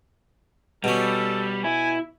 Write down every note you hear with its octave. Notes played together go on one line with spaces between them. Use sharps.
B2 G3 C#4 A4
E4 G#5